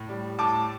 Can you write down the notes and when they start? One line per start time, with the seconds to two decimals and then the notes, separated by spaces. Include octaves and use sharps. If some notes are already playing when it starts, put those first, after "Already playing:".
Already playing: A2
0.09 G3
0.38 A2 A5 D6